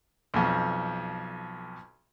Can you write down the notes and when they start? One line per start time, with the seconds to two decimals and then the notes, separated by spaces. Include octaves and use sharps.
0.34 B1 F2